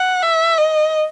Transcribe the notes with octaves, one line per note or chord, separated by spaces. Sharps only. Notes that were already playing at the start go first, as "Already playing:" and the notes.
Already playing: F#5
E5
D#5